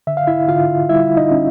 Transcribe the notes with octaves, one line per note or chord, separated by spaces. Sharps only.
D3 E5
F5
E4 E5
D3 F4 F5
G3 E4 E5
D#4 D#5
C#4